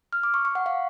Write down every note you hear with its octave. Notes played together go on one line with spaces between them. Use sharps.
F6
D6
C#6
C#6
F#5
F5